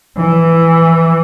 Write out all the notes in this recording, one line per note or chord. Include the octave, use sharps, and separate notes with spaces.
E3